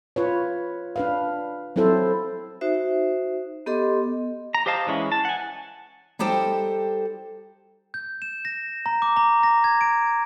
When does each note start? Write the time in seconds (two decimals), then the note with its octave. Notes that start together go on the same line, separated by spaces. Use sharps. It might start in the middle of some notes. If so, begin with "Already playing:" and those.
0.16 F4 B4 C#5
0.96 D4 B4 F5
1.76 F#3 C4 E4 A4 C5
2.61 D#4 F#4 C5 E5
3.66 B3 G4 A4 D#5 C6 D6
4.54 A#5
4.66 G4 C5 D#5 F5 A5
4.87 E3 G#3 C#4 E4
5.12 A5
5.25 F#5 G#5
6.19 G3 D#4 G4 A4 C5 G5
7.94 G6
8.22 E7
8.45 A#6
8.86 A#5
9.02 D6
9.17 A#5
9.43 A#6
9.64 G#6
9.81 D7